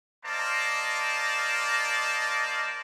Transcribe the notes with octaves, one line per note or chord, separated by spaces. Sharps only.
A#3 A#4 C5 D5 D#5 A5